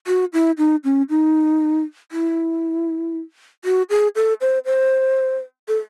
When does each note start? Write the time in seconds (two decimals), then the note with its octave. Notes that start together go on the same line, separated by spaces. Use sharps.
0.07 F#4
0.33 E4
0.58 D#4
0.84 C#4
1.10 D#4
2.12 E4
3.65 F#4
3.90 G#4
4.16 A4
4.41 C5
4.65 C5
5.68 A4